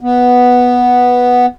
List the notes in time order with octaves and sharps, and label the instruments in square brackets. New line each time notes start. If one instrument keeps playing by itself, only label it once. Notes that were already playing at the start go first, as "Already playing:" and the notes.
[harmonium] B3